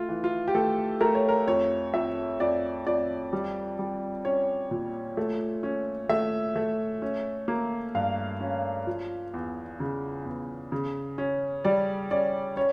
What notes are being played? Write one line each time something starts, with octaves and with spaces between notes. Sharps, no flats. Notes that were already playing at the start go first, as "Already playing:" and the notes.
Already playing: A3 F4
E3
F4
G4
A3 A4
A3 A#4
C#5
A#4
F2 C#5
F2 E5
F2 D5
F2 D5
G3
G3
C#4 C#5
A#2
A3
C#4
A3 E5
A3
C#4
A#3
G2 F5
C#4
F3
E2
C#3
E2
C#3
C#4
G3 D5
C#4 D5
C#4 C#5